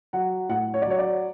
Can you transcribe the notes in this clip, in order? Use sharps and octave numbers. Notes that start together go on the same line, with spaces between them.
F#3 F#5
A2 F#5
C#5
D5
F#3 C#5
D5